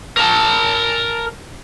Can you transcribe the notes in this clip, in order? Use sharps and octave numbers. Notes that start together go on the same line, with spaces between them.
A#4 A5